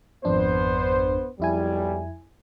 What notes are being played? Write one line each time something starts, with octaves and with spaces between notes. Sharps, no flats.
G#1 F2 B3 D4 C5
B1 F2 G3 E4 G#5